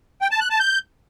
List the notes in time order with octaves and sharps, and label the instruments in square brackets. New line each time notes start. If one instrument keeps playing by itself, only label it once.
[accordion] G5
A5
F#6
A5
G6